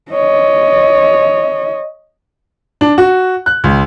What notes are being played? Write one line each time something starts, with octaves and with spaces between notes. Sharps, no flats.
C#5 D#5
D4
F#4
F#6
C#2